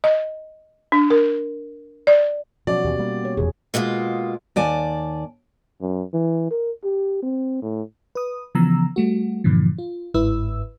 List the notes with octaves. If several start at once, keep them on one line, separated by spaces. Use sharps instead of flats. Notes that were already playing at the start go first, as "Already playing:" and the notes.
D#5
D4
A#4
D5
B2 F3 F#3 C#4 F#4 D5
D#2 B2 E3 G4
G3 A#3
C#5
F1 E2 G#4
B2 G#3 A#3 F4
D#2 D5 G#5 A5
F#2
E3
A#4
G4
C4
A2
B4 D#6
C#3 E3 F3 B3 A#5 E6
G3 A3 F#4
G2 A#2 D3 E3 F3
F4
G1 G#2 E4 B4 E6